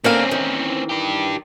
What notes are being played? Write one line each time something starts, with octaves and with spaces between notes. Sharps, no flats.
D3 A#3 C4 C#4 F5
D#3 E3
D4 G4